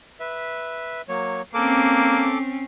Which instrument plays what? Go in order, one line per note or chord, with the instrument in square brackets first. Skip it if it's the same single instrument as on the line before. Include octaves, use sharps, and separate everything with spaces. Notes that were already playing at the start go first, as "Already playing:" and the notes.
[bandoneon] B4 E5
F#3 A#3 C#5
[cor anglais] A#3 [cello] C4 C#4 [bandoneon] A4 D6